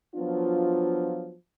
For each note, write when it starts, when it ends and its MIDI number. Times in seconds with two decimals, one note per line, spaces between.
0.15 1.33 53
0.15 1.33 54
0.15 1.33 59
0.15 1.33 62
0.15 1.33 65